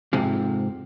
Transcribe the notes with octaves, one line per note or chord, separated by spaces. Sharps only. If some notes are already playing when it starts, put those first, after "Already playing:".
F2 G#2 C3 F3